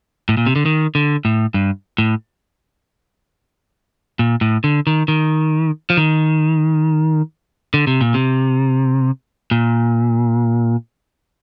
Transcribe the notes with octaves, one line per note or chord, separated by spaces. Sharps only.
A2
A#2
C3
D3
D#3
D3
A2
G2
A2
A#2
A2
D3
D#3
D#3
F3
D#3
D3
C3
A#2
C3
A#2